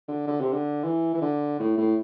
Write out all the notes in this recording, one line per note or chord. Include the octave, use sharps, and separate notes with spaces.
D3
D3
C3
D3
E3
E3
D3
A2
A2